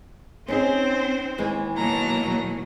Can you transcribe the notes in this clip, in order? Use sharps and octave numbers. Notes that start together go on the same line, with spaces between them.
C4 C#4 D#4 G#4 C5
D#2 E3 G#3
B2 F#3 A#3 A5 A#5